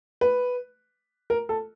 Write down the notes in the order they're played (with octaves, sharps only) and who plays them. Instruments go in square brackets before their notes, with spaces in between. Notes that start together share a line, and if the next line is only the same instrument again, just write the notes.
[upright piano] B4
A#4
A4